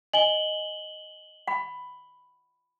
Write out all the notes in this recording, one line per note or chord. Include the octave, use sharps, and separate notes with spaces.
D#5 G#5 F#7 G7
F#5 B5